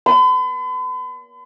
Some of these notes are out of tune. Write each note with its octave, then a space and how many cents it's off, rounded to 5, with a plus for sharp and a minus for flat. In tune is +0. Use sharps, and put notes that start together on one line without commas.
B5 +45